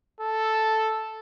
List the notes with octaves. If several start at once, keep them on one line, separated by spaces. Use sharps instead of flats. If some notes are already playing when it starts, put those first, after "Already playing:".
A4